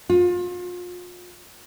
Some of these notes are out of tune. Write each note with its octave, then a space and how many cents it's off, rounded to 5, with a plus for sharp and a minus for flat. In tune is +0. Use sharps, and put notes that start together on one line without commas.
F4 +35